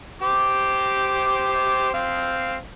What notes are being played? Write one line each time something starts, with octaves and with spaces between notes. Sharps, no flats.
G4 C5 D6
C4 F5